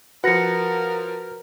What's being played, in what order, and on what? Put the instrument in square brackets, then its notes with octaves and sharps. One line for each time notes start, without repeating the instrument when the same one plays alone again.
[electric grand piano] F3 F#5 [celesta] F#4 A#6 C#7 [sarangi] A#4 [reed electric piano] B4